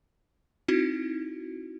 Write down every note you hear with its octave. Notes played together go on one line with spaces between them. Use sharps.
C4 D#4 E4 F#4